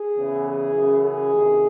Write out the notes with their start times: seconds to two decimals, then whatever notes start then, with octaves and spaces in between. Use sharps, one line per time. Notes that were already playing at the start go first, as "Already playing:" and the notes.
Already playing: G#4
0.15 E2 C#3 E3
0.45 G#4
0.73 F#2 C#3 E3
1.02 G#4
1.31 D2 C3 D#3